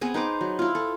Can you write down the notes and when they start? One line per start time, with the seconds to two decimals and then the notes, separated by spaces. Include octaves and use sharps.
0.01 B3 C4 G#4
0.14 D#4 B4 C5 D6
0.41 F#3
0.59 E4 F4
0.75 A4